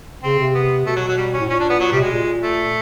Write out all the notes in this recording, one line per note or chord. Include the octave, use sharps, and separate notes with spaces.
C#3 C4
C3
B3
B2 A3
F#3
F#3
G3
C#4
A2
A#2 C#4
D4
B3
F#3
C3 G3
B2 G#3
A#2
A3